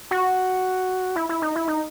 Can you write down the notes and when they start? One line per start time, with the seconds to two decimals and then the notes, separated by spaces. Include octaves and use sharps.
0.11 F#4
1.16 E4
1.29 E4
1.42 D#4
1.56 E4
1.68 D#4